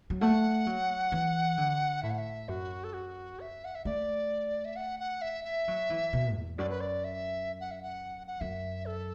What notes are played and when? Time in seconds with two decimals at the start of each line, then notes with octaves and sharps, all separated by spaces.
0.10 F#3
0.21 A3 F#5
0.67 F#3
1.12 E3
1.57 D3
2.03 A2 E5
2.10 F#5
2.18 E5
2.48 F#2 F#4
2.84 A4
2.93 F#4
3.40 E5
3.65 F#5
3.75 E5
3.85 A3 D5
4.65 E5
4.76 F#5
5.00 F#5
5.22 E5
5.44 E5
5.68 F#3
5.90 E3
6.13 B2
6.36 E2
6.58 F#2 D5
6.70 B4
6.81 D5
7.04 E5
7.60 F#5
7.71 E5
7.83 F#5
8.27 F#5
8.41 F#2 E5
8.86 A4